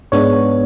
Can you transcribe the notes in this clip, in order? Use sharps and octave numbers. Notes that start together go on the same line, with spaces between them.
G#2 G#3 B3 D4 C#5